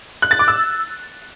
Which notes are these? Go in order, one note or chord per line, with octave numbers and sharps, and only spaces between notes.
F#6
A6
D6
E6